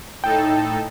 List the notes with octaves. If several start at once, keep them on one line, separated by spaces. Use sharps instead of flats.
A2 D#4 A4 G5